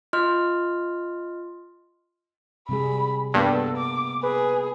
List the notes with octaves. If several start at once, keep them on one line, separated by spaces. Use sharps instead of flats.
F4 D#5 C6 F6
C3 G3 G#4 B5
G2 A#3 B3 A4
D6
G#4 B4